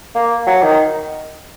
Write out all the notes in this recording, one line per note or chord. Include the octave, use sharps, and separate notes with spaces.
A#3
F#3
D#3